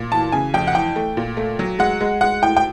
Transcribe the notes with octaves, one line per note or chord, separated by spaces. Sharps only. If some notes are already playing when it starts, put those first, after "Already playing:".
Already playing: A#2
E3 A5
C#3 G#5
F2 G5
F#5
E3 G5
A3
A#2
A3
F#3
G#3 F#5
G#3
G#3 F#5
A2 G5
G5